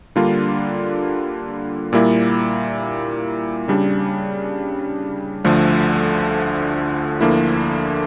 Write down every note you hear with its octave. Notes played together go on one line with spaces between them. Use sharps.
D3 G3 A#3 D4 F4
A#2 G3 A#3 E4
C#3 G3 D4
D2 D3 F3 A3
D2 D3 F3 A#3 E4